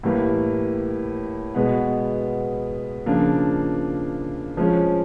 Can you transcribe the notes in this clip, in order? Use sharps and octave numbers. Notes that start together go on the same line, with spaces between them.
A2 E3 G3 A#3
B2 G#3 B3
C#3 F3 A#3 D4 F4
F3 G#3 C#4